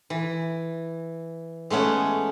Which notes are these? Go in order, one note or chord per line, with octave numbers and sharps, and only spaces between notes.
E3
G#3 A3 B3 C#4